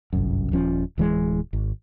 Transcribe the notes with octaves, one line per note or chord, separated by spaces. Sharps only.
G1 C2 F#2
D#1 F3 C#4
D1 E3 G#3
G#1